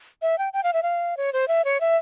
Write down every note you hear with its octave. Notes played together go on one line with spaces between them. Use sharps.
E5
G5
G5
F5
E5
F5
C#5
C5
E5
C#5
E5